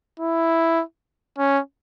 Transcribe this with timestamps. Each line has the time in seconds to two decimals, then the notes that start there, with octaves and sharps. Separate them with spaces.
0.20 E4
1.38 C#4